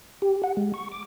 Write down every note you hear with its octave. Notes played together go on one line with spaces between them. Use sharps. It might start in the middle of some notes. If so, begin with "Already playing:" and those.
G4
F#5
G#3
C#6
D6